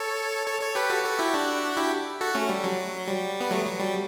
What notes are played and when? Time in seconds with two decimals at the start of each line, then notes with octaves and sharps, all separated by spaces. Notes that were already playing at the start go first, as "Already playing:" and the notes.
Already playing: A4 C#5
0.47 A4 C#5
0.61 A4 C#5
0.75 G4 B4
0.90 F#4 A4
1.04 F#4 A4
1.19 E4 G4
1.34 D4 F#4
1.77 E4 G4
2.21 F#4 A4
2.35 A3 C#4
2.49 G3
2.64 F#3
3.08 G3
3.40 B3
3.51 F#3 A3
3.65 F#3
3.80 G3